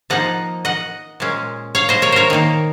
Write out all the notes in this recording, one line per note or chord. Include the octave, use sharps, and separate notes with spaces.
F3 A#3 D#4 D#5 F#5
D#5 F#5
A#2 G#3 C#4
C#5 F5
C5 D#5
A#4 C#5
A#4 C5 C#5
D#3 A#3 D#4